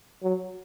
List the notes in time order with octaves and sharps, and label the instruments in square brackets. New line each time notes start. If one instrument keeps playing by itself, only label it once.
[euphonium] F#3